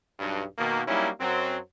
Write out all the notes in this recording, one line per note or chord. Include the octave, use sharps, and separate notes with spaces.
B1 G2
B2 D#3 A#3
F#3 G3 A#3 C#4 D#4 E4
F#2 F#3 C4